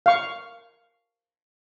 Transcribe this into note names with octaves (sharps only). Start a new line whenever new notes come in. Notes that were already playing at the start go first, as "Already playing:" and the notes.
F5 C#6